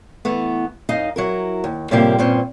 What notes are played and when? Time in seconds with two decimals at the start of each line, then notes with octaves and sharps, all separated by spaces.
0.25 E3 A3 B3
0.89 F#2 D#4 D#5 F5
1.16 F#3 E4 A#4
1.64 D#2
1.91 A2 C3 F3 G3 A#3 G4
2.18 G2 A#2 C4 C#4